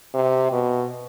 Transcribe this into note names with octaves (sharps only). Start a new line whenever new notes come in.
C3
B2